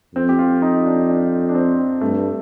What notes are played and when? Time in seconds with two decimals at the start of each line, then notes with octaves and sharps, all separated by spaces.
0.15 F2 C4
0.29 G4
0.39 F4
0.62 D#4
0.85 D4
1.09 D4
1.49 D4
1.55 C4
2.01 G2 A3